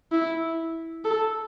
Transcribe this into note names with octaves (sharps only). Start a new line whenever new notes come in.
E4
A4